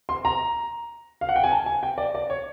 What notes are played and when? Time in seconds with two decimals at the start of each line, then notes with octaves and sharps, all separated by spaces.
0.09 C6
0.25 A#5
1.21 F5
1.29 F#5
1.36 G5
1.44 G#5
1.51 A5
1.66 G#5
1.83 G5
1.98 D5
2.15 D5
2.30 C#5